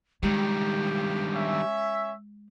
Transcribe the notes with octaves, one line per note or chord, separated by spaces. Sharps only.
G2 D#3 G#3 G4
C#4 E5